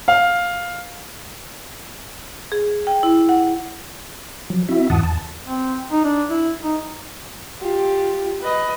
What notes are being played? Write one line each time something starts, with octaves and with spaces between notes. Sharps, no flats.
F5
G#4
G5
E4
F#5
F3 F#3
C4 E4 F#4 E5
E2 G#2 E3 F#5 A5 D#6
E2 A5
C4
D#4
D4
E4
D#4
F4 G4
B4 D#5